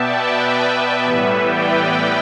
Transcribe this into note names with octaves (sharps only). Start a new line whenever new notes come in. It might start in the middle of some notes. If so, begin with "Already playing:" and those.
Already playing: B2 B3 D5 E5 G5 A5
B4 E5
A2 E3 G3 B3
D5 G5
D5 G5